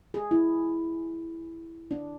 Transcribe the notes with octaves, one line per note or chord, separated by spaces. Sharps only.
G#4
E4
D4